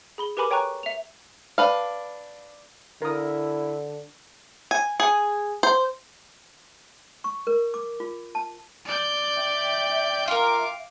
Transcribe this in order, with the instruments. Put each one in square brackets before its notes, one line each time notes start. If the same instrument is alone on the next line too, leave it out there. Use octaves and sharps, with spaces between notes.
[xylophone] G#4 B5 G7
G4 A#4 B4 G#5 B5 D6
C#5 G5 G#5 A#5 C#6 F#6
E5 F7
[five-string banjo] D4 B4 F5
[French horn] D3 [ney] E4 [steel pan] A#4 D#6
[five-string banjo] G#5
G#4
C5
[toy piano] C#6
A#4
D6
F4
A5
[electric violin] D5 G6
[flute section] E5 G5
[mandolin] F4 A#4 [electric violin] F5 D6